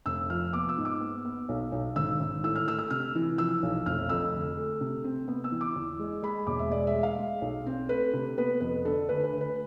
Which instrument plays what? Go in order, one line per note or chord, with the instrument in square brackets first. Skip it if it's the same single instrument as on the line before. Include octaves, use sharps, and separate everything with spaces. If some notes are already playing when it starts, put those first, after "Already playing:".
[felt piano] F1 E6
F3 F6
B3 D6
E6
G#2
D6
B3
B3
B1
B1
G#1 E6
G#1
A2 E6
F6
A3 E6
E6
C3 F6
E3
F3 E6
B1
F1 F6
F2 E6
D2
A3
C3
C4
B3
E6
E3
D6
E2
G#3
G#3 B5
E1 D6
E5
G#3 D5
E5
G#3
F5
G#3
B1
C4
A3 B4
C3
B3 B4
F2 B4
D3 A4
D2 B4
B4
D2
B4